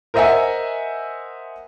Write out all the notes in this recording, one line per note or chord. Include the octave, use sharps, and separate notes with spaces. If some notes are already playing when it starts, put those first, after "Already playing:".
A#4 C5 D#5 E5 F#5 G#5